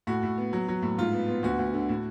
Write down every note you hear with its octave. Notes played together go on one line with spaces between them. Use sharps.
A2 F#4
A2
B3
F#3
F#3
A2
G#2 F4
B3
B3
D2 F#4
D2
D3
A2